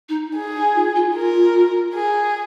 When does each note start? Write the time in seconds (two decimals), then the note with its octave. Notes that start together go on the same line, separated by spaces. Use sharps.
0.09 D#4
0.36 G#4
0.56 D#4
0.75 F4
0.96 F4
1.15 F4 A#4
1.94 G#4